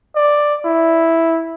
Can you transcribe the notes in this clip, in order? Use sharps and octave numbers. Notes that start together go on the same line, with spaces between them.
D5
E4